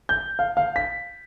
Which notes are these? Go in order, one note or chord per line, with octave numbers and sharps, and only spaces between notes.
G6
F5
F5
B6